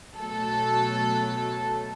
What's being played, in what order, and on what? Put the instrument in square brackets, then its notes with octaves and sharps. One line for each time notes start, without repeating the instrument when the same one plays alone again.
[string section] B2 F#3 A3 A4